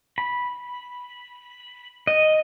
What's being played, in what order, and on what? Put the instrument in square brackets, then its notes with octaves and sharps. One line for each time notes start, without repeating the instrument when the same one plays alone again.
[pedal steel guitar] B5
D#5